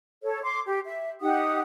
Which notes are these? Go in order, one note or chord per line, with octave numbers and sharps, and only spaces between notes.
A4 C#5
C6 D6
G4
E5
D#4 G4 F#5 D#6